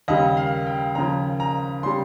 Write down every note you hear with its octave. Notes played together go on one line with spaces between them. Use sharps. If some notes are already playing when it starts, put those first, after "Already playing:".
D#2 C#3 G3 D#5
F5
G5
D#2 C#3 F3 A#5
A#5
C#3 G3 C6